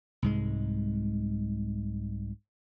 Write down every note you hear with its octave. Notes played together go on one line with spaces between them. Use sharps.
C2 G#2 G#3